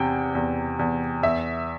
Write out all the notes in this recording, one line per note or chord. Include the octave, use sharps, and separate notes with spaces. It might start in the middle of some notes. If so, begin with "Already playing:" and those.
Already playing: E2 C3 G5
E2
E2
E2 E5